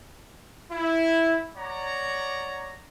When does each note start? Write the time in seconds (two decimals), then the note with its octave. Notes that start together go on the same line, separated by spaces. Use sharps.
0.70 E4
1.56 C#5 D5 F#5 A#5